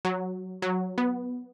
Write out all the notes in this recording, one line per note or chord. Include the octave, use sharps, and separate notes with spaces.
F#3
F#3
B3